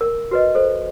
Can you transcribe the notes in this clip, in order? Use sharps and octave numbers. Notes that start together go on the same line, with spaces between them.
A#4
F#4 B4 D#5
A4 C5